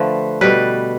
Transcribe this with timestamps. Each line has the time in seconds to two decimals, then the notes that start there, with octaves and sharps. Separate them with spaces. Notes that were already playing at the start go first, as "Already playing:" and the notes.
Already playing: D3 F3 A3 B4
0.41 B2 G3 B4